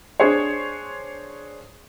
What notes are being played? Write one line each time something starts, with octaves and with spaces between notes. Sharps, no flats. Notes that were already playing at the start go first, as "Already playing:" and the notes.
D4 G#4 C5 C#5